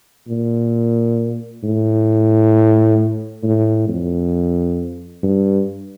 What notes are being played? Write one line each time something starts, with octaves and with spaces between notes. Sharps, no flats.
A#2
A2
A2
F2
G2